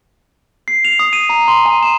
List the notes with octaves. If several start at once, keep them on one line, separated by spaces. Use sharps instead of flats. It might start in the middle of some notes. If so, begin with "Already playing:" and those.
C7
F7
D#6
D#7
A#5
C6
G#5
E7